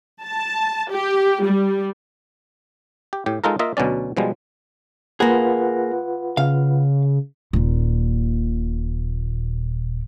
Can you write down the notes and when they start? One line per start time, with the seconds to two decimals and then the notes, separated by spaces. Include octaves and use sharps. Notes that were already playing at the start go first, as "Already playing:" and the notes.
0.21 A5
0.89 G4
1.43 G3
3.13 G4
3.26 A2 G4
3.44 G#3 D#4 F4 A4 A#4
3.59 A#3 F4 D#5 E5
3.77 D2 B2 F#3 C#4 D5
4.17 B2 F3 G3 G#3
5.20 A#3 F4 G#4 B4 F#5
6.37 C#3 F5
7.53 D#1 A#2